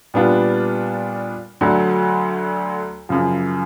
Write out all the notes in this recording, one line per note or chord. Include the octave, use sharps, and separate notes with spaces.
A#2 G3 B3 D4 F4
D2 D3 F#3 A3
F#2 C#3 F3